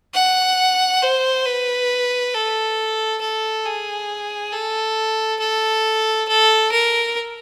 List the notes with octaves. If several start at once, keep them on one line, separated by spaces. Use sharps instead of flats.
F#5
C5
B4
A4
A4
G#4
A4
A4
A4
A#4